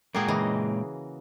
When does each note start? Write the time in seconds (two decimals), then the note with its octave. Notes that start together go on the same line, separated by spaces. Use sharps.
0.15 A#2 G#3 A#3 F#4 G#4 G5
0.28 C#3 E3 D#5